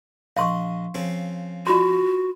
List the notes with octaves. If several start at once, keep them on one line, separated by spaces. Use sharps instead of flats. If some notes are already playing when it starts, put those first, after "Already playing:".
A#1 D#5 F5 C6 C#6
C#3 F3 C4
F4 F#4 C6